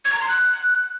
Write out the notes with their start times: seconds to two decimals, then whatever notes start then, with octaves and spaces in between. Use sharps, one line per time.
0.05 G#6
0.13 A#5
0.21 C6
0.28 F#6